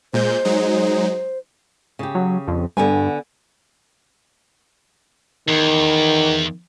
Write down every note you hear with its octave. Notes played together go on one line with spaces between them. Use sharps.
A#2 G#3 C5 G6
F#3 G#3 D#4
C#3 G4
F#3
F2
G2 D3 B3 G#5
E2 D#3